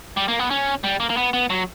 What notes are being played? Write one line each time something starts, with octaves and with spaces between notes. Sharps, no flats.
G3
A#3
B3
C#4
G3
A#3
A#3
B3
B3
F#3